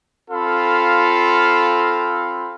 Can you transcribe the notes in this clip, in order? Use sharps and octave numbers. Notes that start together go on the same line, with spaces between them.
C4 F4 A4 F5 B5